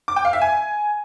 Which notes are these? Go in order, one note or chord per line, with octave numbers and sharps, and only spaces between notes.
D6
G5
F5
E5
G#5